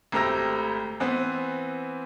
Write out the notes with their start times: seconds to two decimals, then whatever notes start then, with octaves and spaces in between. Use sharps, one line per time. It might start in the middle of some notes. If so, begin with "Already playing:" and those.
0.12 G#1 A3 G4 A#5 E6 A#6
1.00 E3 B3 C4